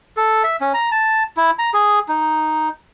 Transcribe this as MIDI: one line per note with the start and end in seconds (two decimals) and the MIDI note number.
0.17 0.43 69
0.44 0.56 76
0.61 0.73 61
0.74 0.89 82
0.92 1.23 81
1.37 1.51 64
1.59 1.70 82
1.74 1.99 68
2.08 2.69 63